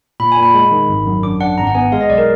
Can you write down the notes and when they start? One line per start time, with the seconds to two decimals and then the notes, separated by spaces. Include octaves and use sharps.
0.20 A#2 B5
0.32 G#5
0.37 A#2
0.43 B5
0.54 G#3
0.71 D#3
0.89 G#1
1.06 F#2
1.23 D4 D6
1.40 D4 F#5
1.58 G#1 A#5
1.67 F#5
1.75 B3 G#5
1.92 G#3 F5
2.01 D#5
2.10 B1 D5
2.18 A#4